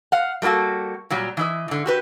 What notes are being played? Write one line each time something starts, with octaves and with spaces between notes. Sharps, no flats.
F5 F#5
G3 A3 A#3 F#4 A4
A#2 F#3 G3
E3 E4 D#5
G#2 D3
F#4 G4 B4